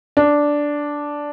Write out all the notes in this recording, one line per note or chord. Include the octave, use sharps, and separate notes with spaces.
D4